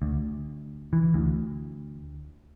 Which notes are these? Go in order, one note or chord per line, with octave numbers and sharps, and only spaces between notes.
D2
E3
D2